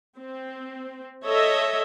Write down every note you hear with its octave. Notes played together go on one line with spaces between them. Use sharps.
C4
A4 C#5 D#5 E5